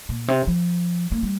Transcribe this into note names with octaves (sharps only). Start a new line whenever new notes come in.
A#2
C3
F3
A#3
G3